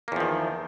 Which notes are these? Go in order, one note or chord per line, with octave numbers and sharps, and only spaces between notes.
E2 D#3 F3 A#3